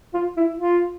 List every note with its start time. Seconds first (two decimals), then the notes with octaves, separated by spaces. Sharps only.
0.14 F4
0.37 E4
0.59 F4